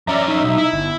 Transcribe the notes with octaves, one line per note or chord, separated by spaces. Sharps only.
F2 C#4 D5 E5 A#5
D#4 E5
B1
E4
G1